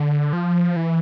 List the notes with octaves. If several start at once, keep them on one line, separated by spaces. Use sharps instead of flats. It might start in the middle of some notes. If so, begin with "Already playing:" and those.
Already playing: D3
F3
E3